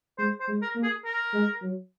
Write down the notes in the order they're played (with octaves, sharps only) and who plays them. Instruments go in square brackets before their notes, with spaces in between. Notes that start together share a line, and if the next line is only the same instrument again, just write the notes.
[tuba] G#3 [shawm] C5
[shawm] C5
[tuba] G#3
[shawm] A#4
[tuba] A#3
[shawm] G#4
A#4
[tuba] G#3
F#3